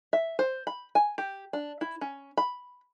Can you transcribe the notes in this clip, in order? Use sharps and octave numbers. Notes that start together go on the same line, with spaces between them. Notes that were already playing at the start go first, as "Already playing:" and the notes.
E5
C5
B5
G#5
G4
D4
E4
C#4
B5